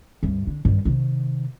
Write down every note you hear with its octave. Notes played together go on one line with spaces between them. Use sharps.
D2 G2
D3
G2 D#3
C3 D#3